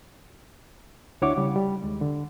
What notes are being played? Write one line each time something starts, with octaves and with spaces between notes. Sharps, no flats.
D2 D4 E4 C#5 F#5 D6
C#3 G3
G3
D#2 G#3
D3